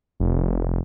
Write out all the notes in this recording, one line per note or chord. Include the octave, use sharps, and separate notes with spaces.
F1